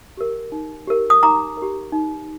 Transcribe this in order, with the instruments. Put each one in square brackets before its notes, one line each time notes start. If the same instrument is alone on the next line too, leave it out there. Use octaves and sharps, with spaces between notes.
[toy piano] G4 A#4
D#4
G4 A#4
D#6
D#4 A#5 D6
G4 A#4
D#4